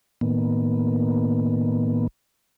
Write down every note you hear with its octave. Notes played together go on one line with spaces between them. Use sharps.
A2 D#3 A#3 B3